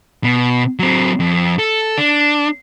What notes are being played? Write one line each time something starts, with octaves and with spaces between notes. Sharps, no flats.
B2
F#3 C4
F2
A4
D4